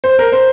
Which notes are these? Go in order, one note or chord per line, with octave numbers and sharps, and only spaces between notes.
C5
A#4
C5